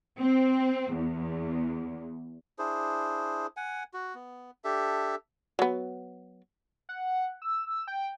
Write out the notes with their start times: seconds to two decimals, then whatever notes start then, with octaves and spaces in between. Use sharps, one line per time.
0.18 C4
0.93 E2
2.59 D4 E4 G#4 C5
3.57 F#5 G#5
3.94 F#4
4.15 B3
4.64 D4 G4 A4 E5
5.59 F#3 B3
6.89 F#5
7.42 E6
7.87 G5